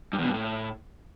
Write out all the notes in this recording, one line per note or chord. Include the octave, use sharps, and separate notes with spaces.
G2
E2
B2
G2
A2